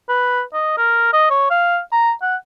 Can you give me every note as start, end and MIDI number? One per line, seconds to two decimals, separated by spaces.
0.09 0.42 71
0.54 0.75 75
0.77 1.08 70
1.13 1.28 75
1.30 1.49 73
1.51 1.79 77
1.92 2.12 82
2.22 2.36 78